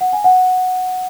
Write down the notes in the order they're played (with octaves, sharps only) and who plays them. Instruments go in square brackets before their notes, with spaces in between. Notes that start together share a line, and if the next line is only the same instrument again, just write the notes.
[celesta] F#5
G#5
F#5